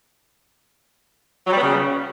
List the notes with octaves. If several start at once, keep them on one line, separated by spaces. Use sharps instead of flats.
F#3
G3
B3
C#3